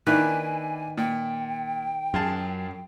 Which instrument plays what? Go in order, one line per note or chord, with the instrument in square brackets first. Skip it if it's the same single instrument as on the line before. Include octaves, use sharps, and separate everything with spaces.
[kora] D#3 B4 [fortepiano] A#3 D4 E4 [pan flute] G#5
[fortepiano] A#2 [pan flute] G5
[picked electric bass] F#2 [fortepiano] F4 G#4 A5